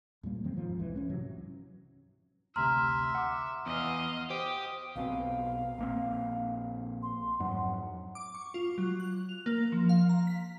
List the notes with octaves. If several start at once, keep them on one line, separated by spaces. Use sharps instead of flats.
E2 A#2 G3 A#3
F2 D#3 F#3 C4
D#1 G#2 F3
C2 F2 E3 G#3
E3 B3 C#4
G#2 C3 F#3
A1 D2 C3 E5 A#5 C6 F6
F#5 D6
E2 D#5 F5
G4 C5 D#6
B1 B2 C4 F5
A#1 A#3 C4
C6
F2 G#2 F#3 F#5
D6
C#6
F4
F#3
F#6
F7
A#3
F3
F5
A#5
B6